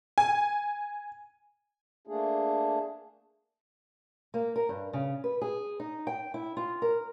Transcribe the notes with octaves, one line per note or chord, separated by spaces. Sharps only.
G#5
A3 A#3 D4 G#4
A#3
A#4
G2
C#3
B4
G#4
D#4
G5
E4
F4
A#4